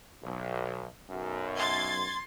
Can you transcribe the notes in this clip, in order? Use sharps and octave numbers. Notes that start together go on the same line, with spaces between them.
B1
B1 F#2
C6 G#6 A6